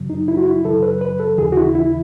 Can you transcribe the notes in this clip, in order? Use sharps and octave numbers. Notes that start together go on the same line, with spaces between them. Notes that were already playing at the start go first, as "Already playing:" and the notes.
Already playing: F#2 C#3 F#3
D#4
E4
F#4
E4
F#2 C#3 F#3 A4
B4
B4
A4
D#2 C#3 E3 G#4
F#4
E4
E4